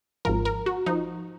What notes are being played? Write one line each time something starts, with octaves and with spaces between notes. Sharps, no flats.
G#1 G#2 F3 A#4
A#4
F#4
F3 D#4